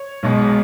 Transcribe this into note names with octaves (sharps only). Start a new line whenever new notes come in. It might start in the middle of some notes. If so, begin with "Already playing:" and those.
Already playing: C#5
B1 B2 G#3